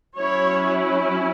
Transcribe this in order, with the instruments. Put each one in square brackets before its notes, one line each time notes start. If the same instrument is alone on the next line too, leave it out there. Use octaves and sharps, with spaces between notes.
[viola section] F#3 C#4 E4 C#5